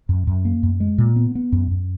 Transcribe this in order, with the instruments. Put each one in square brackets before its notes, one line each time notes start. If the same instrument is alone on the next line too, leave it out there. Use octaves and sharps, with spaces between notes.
[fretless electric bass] F#2
F#2
A#3
F#2
G#3
A#2
B3
B3
F#2
F#2